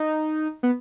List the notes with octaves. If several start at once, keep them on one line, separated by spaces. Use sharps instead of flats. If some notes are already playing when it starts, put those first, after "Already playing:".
Already playing: D#4
B3